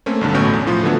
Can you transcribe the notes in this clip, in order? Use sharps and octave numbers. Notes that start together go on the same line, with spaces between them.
A3 A#3 C4 C#4
B1 G2 D3
A1 B2 A3 C#4 C#6 G6
E2
A2 F3 F4 D#6
D3 E3 F#3 A3 B3 D4